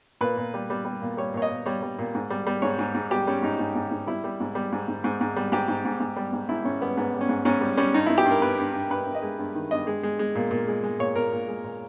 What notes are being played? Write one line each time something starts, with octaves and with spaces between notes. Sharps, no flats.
A#2 B4
A#2
G3
G3
G3
A#2
G3 C#5
A#2 C#5
D#5
A#2
G3 C#5
G3
A#2
G#2
G3
G3
G#2 C#5
G#2
G#2
G3 G4
G3 C#4
G#2 D#4
G#2
G#2
G#2
G3 E4
G3
G#2
G3
G#2
G#2
G#2
G#2
G3
G#2 G4
G#2
G#2
G#2
G3
G#2
G#2 E4
G#2 C#4
G3 B3
G#2 B3
G3
C#4
G#2
G#2 C#4
G3
G3 C#4
G2 D#4
G2 E4
G4
G2
A#4
G2 B4
G2
G2
G2 B4
G2
D#5
G#3
G2
D#3
G2 D#5
G#3
G#3
G#3
A#2
A#2
G#3
G#3
A#2 C#5
A#2 A#4
A#2
G#3
A#2